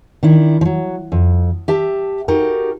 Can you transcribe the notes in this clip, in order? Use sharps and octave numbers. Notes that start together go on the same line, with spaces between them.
D#3 D4 E4
F3 F#3
F2
G4 E5 A5
D#4 F#4 G4 A4 A#4